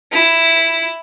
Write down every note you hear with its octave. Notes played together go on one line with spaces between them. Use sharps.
E4